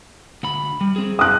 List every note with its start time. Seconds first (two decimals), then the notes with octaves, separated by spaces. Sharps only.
0.43 D2 B5
0.81 G3
0.96 C4 G#4
1.19 D#6 F#6